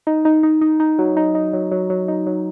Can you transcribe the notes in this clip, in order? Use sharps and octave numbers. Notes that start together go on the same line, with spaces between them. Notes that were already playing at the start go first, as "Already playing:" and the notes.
D#4
D#4
D#4
D#4
D#4
F#3
D#4
D#4
F#3
F#3
F#3
D#4
F#3